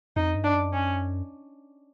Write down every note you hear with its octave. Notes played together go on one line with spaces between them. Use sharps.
F2 D#4
G2
D4
F#2
C#4